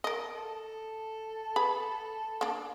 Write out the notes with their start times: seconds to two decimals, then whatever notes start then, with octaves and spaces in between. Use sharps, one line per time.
0.04 A#4 D#5
0.35 A4
1.56 G#4 B4 B5
2.41 A#3 D4